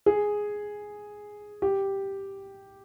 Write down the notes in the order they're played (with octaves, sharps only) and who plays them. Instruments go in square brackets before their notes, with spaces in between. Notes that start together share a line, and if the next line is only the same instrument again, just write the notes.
[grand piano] G#4
G4